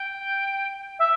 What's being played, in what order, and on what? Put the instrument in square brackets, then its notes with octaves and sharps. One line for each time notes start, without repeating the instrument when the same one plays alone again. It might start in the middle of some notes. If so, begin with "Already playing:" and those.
Already playing: [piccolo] G5
E5